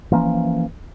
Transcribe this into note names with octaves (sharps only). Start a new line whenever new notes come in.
E3 F3 A#3 C#4